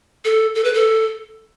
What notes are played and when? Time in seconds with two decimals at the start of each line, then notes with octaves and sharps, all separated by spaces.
0.25 A4
0.55 A4
0.64 B4
0.74 A4